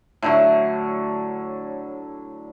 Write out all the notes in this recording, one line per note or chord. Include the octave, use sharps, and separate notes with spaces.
A2 D3 F#3